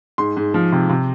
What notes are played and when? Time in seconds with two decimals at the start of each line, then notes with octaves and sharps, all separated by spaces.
0.18 G#2 C6
0.37 G#2
0.54 F3
0.72 C3
0.89 C3